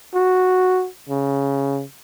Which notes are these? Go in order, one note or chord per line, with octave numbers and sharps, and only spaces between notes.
F#4
C#3